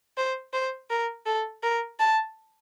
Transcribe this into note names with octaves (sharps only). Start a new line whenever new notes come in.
C5
C5
A#4
A4
A#4
A5